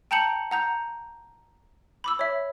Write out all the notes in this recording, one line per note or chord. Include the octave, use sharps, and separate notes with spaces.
G5 A5 A#5 G6 C#7 F#7
F#5 A#5 G6
B5 D6 E6
C#5 E5